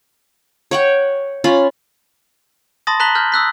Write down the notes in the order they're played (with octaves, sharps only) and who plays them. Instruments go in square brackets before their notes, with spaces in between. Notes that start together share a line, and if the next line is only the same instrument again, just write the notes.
[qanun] C#5 F#5 G5
C#4 F4 B5
[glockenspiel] A5 B5 C6 D#6 A6 A#6
A5 A#5 F#6 B6 F#7 G7
A5 F6 G6
D#6 E6 F#6 B6